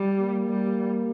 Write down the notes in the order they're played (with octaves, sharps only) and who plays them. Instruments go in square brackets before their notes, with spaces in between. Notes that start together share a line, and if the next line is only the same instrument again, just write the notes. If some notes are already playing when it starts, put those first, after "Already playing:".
Already playing: [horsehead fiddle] G3
[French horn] A#3
[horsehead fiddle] G3